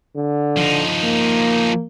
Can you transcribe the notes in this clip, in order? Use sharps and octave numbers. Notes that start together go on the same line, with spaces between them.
D3
F3 D#4
A#3